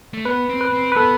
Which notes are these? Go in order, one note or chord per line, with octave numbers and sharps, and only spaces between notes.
A3
B3 B4
C4
B4
C4
B4
B3 A4